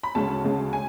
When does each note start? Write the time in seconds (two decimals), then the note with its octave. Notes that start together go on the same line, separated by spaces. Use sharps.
0.03 B5
0.15 D2 C#3 G#3 C#4 A5
0.44 D2 C#3 G#3 C#4
0.73 G#5